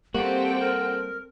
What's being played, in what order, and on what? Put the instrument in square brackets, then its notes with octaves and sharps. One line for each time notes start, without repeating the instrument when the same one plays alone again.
[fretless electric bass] G3 A#3 [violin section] C4 A4 G5 [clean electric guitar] F#4 [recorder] G4
[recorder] A#4